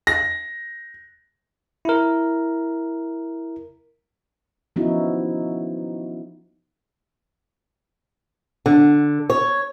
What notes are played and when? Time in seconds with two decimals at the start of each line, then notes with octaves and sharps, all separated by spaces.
0.07 A#6
1.85 E4 A#4
4.76 F3 B3 C#4 D#4 E4 F#4
8.66 D3
9.30 C#5